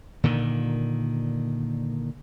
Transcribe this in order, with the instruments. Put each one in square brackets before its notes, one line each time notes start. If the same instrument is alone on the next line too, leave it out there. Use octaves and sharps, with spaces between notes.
[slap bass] A#2 D3 D#3